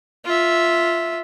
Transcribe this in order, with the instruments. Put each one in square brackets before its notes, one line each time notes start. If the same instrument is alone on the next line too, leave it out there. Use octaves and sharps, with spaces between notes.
[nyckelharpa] F4 E5